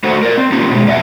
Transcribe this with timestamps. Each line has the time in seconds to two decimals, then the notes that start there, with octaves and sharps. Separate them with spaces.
0.04 A3 F#4 A4 C5 F#5
0.23 A#4 D5
0.37 C4
0.52 A#3 C#4 D#4 F4 G4
0.71 B2 G#3
0.87 F#2 D5 E5 F#5 G#5